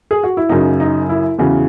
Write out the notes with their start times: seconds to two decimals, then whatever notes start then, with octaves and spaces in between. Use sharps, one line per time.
0.11 G#4
0.23 F#4
0.37 E4
0.49 F#2 C#3 F#3 D#4
0.80 D#4
1.09 E4
1.38 E2 C#3 E3 F#4